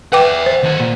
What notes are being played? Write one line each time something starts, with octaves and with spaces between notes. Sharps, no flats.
B4 E5 F#5 G5 D6
C5
D#3 F#5
A#2